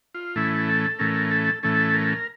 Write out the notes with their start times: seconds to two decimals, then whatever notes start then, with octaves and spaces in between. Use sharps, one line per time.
0.15 F4
0.35 A2 E3 A3 C#4 E4
0.68 A4
0.99 A2 E3 A3 C#4 A#4
1.31 A4
1.63 A2 E3 A3 C#4 A4
1.94 A#4